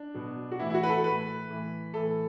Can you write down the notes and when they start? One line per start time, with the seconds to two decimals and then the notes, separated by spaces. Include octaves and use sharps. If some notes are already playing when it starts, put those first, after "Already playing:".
Already playing: D4
0.14 B2 F#3
0.52 F#4
0.59 A2 E3 E4
0.70 E4
0.74 F#4
0.83 B4
0.89 A4
1.04 A2 E3 B4
1.49 A2 E3
1.94 A2 E3 A4